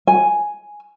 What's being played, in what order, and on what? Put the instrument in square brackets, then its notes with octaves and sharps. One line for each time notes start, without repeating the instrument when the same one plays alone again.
[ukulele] G#5